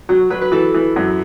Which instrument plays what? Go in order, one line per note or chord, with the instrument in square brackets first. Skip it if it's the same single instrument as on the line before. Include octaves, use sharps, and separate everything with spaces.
[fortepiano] F#3 [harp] F#4
[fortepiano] F#3 [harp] B4
[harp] B4
[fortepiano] E3 [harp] A4
[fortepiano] E3
F#2